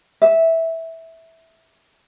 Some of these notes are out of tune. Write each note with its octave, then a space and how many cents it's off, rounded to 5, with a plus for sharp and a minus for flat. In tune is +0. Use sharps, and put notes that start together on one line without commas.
E5 -10